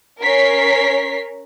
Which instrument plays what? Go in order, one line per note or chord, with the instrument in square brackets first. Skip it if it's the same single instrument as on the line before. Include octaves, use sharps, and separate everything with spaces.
[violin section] C#4 A#4 C#5 B6 C7